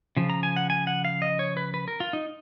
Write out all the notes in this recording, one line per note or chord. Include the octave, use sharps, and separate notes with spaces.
C#3 F3
A#5
G#5
F#5
G#5
F#5
F5
D#5
C#5
B4
B4
A#4
F4
D#4